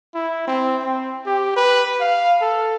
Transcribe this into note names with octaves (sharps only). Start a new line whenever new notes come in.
E4
C4
C4
G4
B4
F5
A4